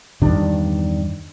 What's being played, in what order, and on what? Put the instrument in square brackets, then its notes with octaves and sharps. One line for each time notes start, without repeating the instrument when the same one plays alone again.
[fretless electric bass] E2 G2 D#3 D4